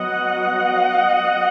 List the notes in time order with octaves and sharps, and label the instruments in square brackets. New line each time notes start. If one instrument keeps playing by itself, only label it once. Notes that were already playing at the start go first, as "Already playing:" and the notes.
Already playing: [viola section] F#3 B3 D#5 F#5